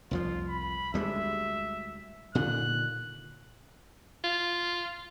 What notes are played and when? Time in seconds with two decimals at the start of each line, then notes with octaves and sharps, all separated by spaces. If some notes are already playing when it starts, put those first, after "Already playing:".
0.11 C2 F2 F3 F4
0.49 B5
0.94 D2 G3 G#3 E5
2.35 A#2 D3 D#3 F#6
4.24 F4